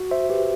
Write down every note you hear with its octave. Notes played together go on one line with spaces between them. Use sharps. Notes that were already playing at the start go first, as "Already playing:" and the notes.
Already playing: F#4
C5 E5
G4 B4